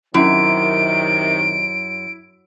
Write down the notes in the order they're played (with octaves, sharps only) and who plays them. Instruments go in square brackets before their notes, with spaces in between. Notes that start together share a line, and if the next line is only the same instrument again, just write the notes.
[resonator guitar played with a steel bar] F#2 [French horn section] C3 D#3 [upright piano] E4 [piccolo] D7